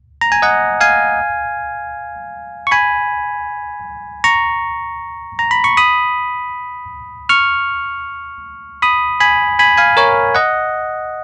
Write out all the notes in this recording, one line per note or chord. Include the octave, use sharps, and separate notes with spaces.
A#5
G#5
D#5 F#5
F5 G#5
C#6
G#5 B5
A#5 C#6
A#5
B5
C#6
B5 D#6
C#6 F6
B5 D#6
G#5 B5
G#5 B5
F5 G#5
A#4 C#5
D#5 F#5